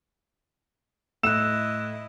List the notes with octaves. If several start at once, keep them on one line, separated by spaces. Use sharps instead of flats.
A2 E4 D#5 E6 F#6 E7